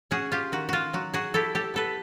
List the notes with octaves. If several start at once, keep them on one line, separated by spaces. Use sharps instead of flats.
C#4 F#4 G#4
F4 G4
D#3 F#4
F4 F#4
F#3 F#4
F#4 G#4
E4 G4 A4
G4 A4
B3 A4 B4